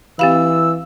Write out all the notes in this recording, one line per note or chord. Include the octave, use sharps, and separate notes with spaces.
E3 C4 G4 F5 B5 E6